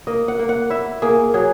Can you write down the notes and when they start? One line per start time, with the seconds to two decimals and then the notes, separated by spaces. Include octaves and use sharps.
0.07 A#3 D#5
0.28 F#5
0.39 A#3
0.49 F#5
0.70 E4 E5
1.02 A#3 G#4
1.34 F#3 G#4